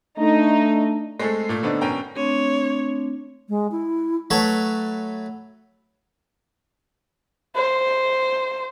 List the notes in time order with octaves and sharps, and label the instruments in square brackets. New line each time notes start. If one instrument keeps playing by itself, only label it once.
[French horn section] A3 D4 [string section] D#4
[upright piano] G#3 A3 C4 G#4 A4
A#2 A3
D3 A3 B3 C4 D4 D#4
F#1 B2 C#4 A#4 G5 A#5
[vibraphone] A3 C4 D4 [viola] C#5
[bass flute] G#3
E4
[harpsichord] F#3 A3 A4 B4 C#5
[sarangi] C5